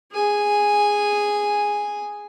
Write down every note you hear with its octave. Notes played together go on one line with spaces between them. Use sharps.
G#4 G#5